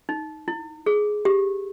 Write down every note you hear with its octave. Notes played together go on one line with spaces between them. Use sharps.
D#4
E4
G#4
G4